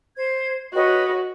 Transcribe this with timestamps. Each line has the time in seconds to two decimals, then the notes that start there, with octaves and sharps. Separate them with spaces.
0.16 C5 G#6
0.74 F#4 B4 C#5 D#5